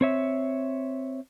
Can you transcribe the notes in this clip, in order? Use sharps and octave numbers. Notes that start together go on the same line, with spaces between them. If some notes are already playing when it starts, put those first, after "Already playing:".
C4 C#5 E5